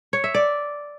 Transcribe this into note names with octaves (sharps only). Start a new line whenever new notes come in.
C#5
E5
D5